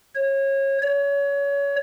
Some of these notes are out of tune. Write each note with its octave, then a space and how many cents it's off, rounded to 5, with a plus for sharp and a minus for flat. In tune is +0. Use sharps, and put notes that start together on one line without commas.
C#5 -25
C#5 +25